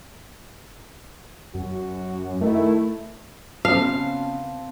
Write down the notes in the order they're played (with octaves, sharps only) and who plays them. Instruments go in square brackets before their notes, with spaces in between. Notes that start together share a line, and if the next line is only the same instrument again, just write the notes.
[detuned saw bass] F#2 [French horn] F#4
[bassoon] D#3 [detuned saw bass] A3 [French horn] E4
[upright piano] C#3 B3 [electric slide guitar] C4 A5 [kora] F5